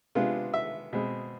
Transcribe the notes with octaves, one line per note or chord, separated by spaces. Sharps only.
C3 G#3 B3 D4 F4
E5
B2 G#3 C4